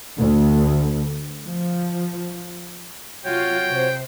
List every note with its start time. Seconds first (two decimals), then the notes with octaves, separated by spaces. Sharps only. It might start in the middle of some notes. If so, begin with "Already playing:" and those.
0.17 D2
1.44 F3
3.25 C3 F#3 F4 F#4 C#5 G5
3.69 C3 C5